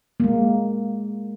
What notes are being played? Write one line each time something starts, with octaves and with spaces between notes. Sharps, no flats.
G#3 A#3